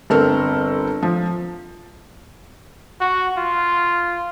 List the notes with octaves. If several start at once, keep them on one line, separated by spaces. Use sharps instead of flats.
G1 C4 A4 A#4 F6
F3
F#4
F4